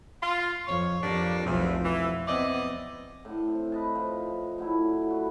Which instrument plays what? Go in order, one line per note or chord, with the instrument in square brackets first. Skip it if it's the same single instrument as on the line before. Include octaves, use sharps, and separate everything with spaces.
[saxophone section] F4
[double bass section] F2 [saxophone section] C#5
[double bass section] F2 [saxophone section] G3 A#3 D4
[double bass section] F1 B1 F3 [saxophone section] E2
[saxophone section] E3
[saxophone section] E3 D5 D#5 [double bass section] B3 C4
[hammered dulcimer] A2 D3
C4
B4 D#5 A5
F3
A2 D3 F#3 E4
F#4 B4